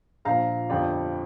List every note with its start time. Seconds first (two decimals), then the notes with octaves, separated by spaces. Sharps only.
0.25 A#1 A#2 F3 F5 A#5
0.70 G1 F2 F3 D5 G5